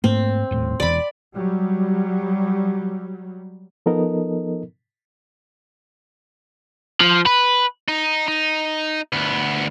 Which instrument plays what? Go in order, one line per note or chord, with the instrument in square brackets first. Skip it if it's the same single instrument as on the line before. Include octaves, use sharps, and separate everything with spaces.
[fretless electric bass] G#2 A3 A#3 [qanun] C4
[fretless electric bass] D#1 A2
[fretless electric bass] E1 E2 [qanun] D5 B5
[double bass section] F#3 G3
[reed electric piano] F3 B3 D#4 A4 A#4 D#5
[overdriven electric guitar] F3
B4
[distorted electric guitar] D#4
D#4
D2 B3